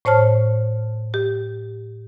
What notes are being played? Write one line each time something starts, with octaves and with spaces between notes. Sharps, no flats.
A2 C5 C#5 A5 F6
G4